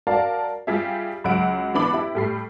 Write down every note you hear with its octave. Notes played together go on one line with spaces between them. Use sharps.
F#4 A#4 D5 F5 A5
G3 F4 G4 G#4 E5
C#2 F#3 F#5 D7
E3 B3 D4 B5 D6 F#7
E4 G4
A2 G3 C7